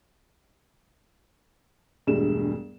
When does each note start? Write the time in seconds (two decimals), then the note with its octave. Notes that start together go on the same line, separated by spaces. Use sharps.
2.07 E1 G2 G#3 A3 D4 E7